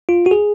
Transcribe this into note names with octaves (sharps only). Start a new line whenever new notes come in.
F4
F#4
G#4